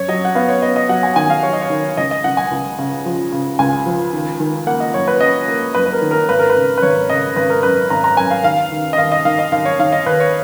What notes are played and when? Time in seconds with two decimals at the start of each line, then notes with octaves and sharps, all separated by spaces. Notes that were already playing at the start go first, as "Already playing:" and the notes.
Already playing: F#2 C#5
0.08 F#3 D#5
0.25 F#5
0.35 B3 F5
0.49 C#5
0.62 B3 D#5
0.76 D#5
0.89 F#3 F#5
1.03 G#5
1.16 D#3 G#5
1.30 F5
1.43 F#3 C#5
1.53 D#5
1.61 C#5
1.70 D#3
1.97 C#2 D#5
2.11 D#5
2.24 C#2 F#5
2.37 G#5
2.51 C#2
2.78 C#3
3.06 F3
3.32 C#3
3.59 C#2 G#5
3.86 F3
4.13 D#3
4.40 D#3
4.67 A#3 F#5
4.80 D#5
4.94 F#2 C#5
5.08 B4
5.21 C#4 D#5
5.48 A#3
5.75 F#2 B4
5.86 B4
5.93 A#4
6.02 D#3
6.11 A#4
6.29 G#1 B4
6.39 A#4
6.50 B4
6.56 C#3
6.78 B4
6.82 G#1 C#5
7.10 C#3 D#5
7.36 G#1 B4
7.50 A#4
7.63 F#2 B4
7.90 G#1 A#5
8.04 A#5
8.17 F#2 G#5
8.30 F5
8.44 D#2 F5
8.72 D#3
8.93 D#5
8.98 D#2 F5
9.12 D#5
9.25 D#3 F5
9.39 D#5
9.52 D#2 F5
9.65 C#5
9.79 D#3 F5
9.92 D#5
10.06 D#2 B4
10.20 C#5